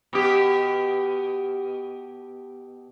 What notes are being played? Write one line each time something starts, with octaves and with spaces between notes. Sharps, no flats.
B2 G4